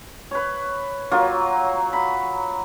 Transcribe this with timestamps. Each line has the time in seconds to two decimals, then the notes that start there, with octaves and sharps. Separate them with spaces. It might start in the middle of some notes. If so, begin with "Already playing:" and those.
0.31 B4 C#5
1.11 F#3 A#3 F4
1.93 B5